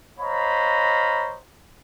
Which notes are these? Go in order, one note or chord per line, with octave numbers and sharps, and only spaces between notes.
C5 C#5 D#5 F5 A#5 B5